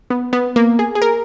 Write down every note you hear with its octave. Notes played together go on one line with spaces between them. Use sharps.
B3
B3
A#3
G#4
G#4
A#4